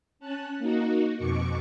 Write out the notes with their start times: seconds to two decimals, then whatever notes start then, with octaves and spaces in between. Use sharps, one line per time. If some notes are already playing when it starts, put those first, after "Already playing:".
0.19 C#4 A5 F#6
0.58 A#3 D#4 F#4
1.16 F2 B2 C#6 D6 C#7